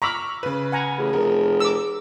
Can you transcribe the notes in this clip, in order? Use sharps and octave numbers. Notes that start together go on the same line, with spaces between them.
A#5 B5 C#6 D6 E6 F6
C#3 B4
F#5 G#5 A#5
A1 G#4
F1 A#4
D6 E6